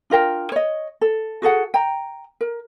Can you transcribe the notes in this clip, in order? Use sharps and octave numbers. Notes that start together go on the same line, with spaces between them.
D4 F4 A#4 G5
C#5 D#5
A4
F#4 G#4 A4 F#5
G5 A#5
A#4